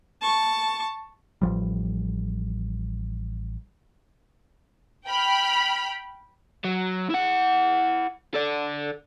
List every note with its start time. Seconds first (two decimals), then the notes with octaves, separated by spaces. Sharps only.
0.21 A5 C#6
1.42 A1 F3 G3
5.07 G5 B5 F6
6.64 F#3
7.10 E4 F#5
8.35 A4 D5